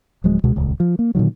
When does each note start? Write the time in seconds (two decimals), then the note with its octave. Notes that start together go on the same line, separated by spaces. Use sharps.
0.24 D1 F3 F#3 G#3
0.44 C#2 B2 G#3
0.56 D#1 C#2
0.80 F3
0.99 A#3
1.15 A#2 D3 D#3 F#3